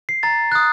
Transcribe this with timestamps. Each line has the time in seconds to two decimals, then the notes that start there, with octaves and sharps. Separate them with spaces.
0.09 C7
0.23 A#5 A6
0.52 D#6 F#6